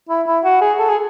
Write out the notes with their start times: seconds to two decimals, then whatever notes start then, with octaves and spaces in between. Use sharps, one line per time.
0.09 E4
0.27 E4
0.44 F#4
0.61 G#4
0.79 A4
0.90 G#4